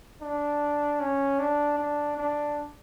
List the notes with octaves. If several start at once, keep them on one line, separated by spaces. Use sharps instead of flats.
D4
C#4
D4
D4
D4